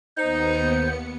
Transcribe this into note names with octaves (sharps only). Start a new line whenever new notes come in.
D#2 B3 D#4 C5 C#7